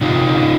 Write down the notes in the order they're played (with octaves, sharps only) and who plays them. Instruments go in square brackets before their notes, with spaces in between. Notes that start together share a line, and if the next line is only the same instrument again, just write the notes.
[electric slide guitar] C3 D#4 F4